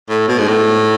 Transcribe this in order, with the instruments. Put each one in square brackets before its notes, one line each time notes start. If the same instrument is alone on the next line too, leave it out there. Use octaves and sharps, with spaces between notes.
[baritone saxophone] A2
B2
G#2
A2